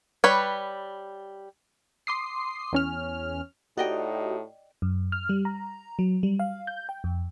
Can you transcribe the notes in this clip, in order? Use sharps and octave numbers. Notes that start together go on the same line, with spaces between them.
G3 B4 C#5
C6 D6 D#6 C7
E2 C#4 F6
A2 D#4 F#4 G4 D5 D#5 G5
F#2
F6
G3
A#5
F#3
G3
F5
G6
G5
F2